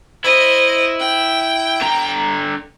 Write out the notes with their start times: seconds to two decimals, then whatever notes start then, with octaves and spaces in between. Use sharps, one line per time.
0.24 E4 C5 D#5
0.99 G5
1.82 D3 A#5